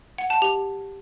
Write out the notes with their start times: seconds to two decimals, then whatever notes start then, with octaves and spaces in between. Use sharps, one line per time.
0.18 F#5
0.30 A5
0.42 G4